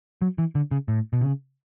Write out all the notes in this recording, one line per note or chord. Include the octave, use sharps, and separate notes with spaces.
F#3
E3
D3
C#3
A2
B2
C#3